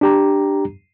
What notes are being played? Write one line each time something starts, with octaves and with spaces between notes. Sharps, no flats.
D4 G4 A#5